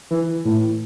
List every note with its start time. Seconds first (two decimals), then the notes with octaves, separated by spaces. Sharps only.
0.11 E3
0.45 A2